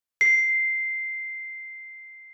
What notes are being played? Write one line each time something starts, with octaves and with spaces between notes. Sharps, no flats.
C7